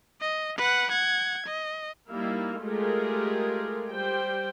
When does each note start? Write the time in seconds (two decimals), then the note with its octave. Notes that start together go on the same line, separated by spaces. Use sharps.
0.22 D#5
0.58 B4 F#5
0.91 F#5 G#6
1.47 D#5
2.10 G3 A#3 D#4 E4 F5
2.61 G#3 A3 F4 G4 G#4 A#4
3.88 G3 C5 G5